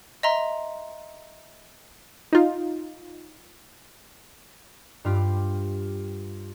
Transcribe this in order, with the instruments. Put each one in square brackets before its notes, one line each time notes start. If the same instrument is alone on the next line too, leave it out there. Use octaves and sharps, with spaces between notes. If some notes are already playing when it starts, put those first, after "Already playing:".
[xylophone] D#5 E5 A#5 C6
[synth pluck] D#4 F4
[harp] G2 F4 G4